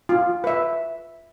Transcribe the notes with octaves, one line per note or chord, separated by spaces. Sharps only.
F4
B4 E5